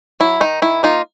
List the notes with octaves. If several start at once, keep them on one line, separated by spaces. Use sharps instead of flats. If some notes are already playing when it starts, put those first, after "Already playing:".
F#3 E4
D#3 D#4
D#3 E4
A#3 D#4 F4